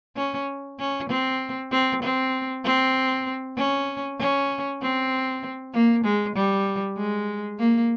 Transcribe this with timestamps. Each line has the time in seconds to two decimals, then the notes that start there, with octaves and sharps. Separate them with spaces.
0.16 C#4
0.79 C#4
1.09 C4
1.71 C4
2.02 C4
2.64 C4
3.57 C#4
4.19 C#4
4.81 C4
5.74 A#3
6.04 G#3
6.35 G3
6.97 G#3
7.59 A#3